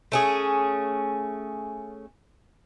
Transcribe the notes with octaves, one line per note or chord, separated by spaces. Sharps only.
A3 C#4 G#4